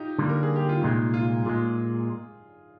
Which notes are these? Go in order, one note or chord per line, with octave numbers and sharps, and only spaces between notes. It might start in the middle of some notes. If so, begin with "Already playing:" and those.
Already playing: D#4 F4 G4
D3 G3 A#3
A#4
G#4
G4
F4
C2 A#2 G#3 D#4
F4
A#2 G#3 G#4